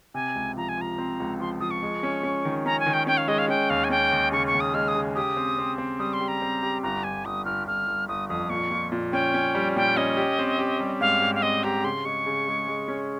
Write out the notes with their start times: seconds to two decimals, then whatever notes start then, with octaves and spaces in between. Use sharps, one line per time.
0.14 C3 G#5
0.35 C#2
0.57 F3 A#5
0.69 G#5
0.77 F3 A#5
0.98 C4
1.20 C#2
1.40 F3 C6
1.60 F3 D#6
1.71 C#6
1.82 G#3
2.03 C#4
2.23 C#4
2.45 D#3
2.66 C#4 A#5
2.80 G#5
2.86 D#3
2.93 G5
3.07 C#4 G5
3.17 F5
3.28 G#3 D#5
3.39 F5
3.49 C#4 G5
3.70 D#2 F5
3.84 G#5
3.90 C#4 G5
4.12 D#2
4.32 C#3 C#6
4.47 C#6
4.54 D#2
4.60 D#6
4.74 G#3 F6
4.88 D#6
4.95 C#3
5.15 G4 D#6
5.37 C4
5.58 C4
5.78 C4
5.99 G3 D#6
6.13 C6
6.21 G4
6.28 A#5
6.42 C4
6.63 G4
6.83 G1 A#5
7.04 G1 G#5
7.25 G1 D#6
7.45 G1 F6
7.67 G1 F6
7.87 G1
8.08 G1 D#6
8.29 F2 D#6
8.50 A#2 C#6
8.71 A#2
8.92 A#2
9.12 C#4 G5
9.34 C#4
9.55 G3
9.76 A#2 G5
9.97 C#4 D#5
10.17 G4
10.39 C4
10.59 G4
10.81 G3
11.01 G#2 F5
11.22 G#2
11.35 F5
11.42 C4 D#5
11.64 G4 A#5
11.84 C#3 C6
12.05 G#3 C#6
12.26 C#3
12.47 G#3
12.68 G#3
12.88 C#4